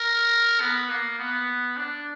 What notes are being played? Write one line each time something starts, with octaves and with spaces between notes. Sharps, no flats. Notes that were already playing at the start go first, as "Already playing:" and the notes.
Already playing: A#4
B3
A#3
B3
D4